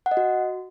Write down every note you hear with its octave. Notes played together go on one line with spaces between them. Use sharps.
F#5
D#5
F#4